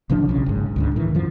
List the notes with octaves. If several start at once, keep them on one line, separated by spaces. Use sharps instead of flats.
A1 C#3 F3 D4
B1 C#3
F#1 G#2
C#2 G#2 D3
A2 D#3 E3
F#2 F3